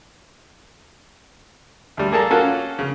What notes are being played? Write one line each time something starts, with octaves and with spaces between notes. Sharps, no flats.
D2 G3
A#3 G#4 A4 A5 A#5
A#3 C#4 F4 F#4 A4
C#3